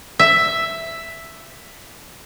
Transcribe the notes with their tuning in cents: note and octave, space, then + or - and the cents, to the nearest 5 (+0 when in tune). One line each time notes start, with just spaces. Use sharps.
E5 +5